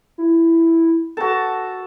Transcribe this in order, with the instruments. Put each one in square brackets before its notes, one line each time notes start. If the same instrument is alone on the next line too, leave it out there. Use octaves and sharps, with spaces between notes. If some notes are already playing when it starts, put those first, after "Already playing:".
[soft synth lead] E4
[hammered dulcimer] F#4 A5 [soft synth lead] A4